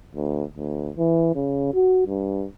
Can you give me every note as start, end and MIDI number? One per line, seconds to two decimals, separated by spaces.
0.16 0.44 38
0.57 0.90 38
0.97 1.32 52
1.35 1.70 49
1.74 2.03 66
2.07 2.46 43